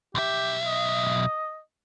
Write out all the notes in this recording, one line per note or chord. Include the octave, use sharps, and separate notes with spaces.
B1 G4 E5
D#5